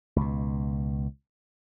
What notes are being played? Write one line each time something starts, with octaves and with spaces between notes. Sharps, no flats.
C#2 B2